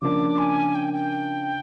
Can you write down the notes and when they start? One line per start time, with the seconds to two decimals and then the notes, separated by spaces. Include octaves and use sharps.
0.02 C#3 F3 A#3 D4 D6
0.38 G#5
0.75 G5
0.94 G5